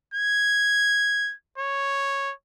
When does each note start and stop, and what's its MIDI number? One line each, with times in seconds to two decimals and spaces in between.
0.14 1.34 92
1.58 2.33 73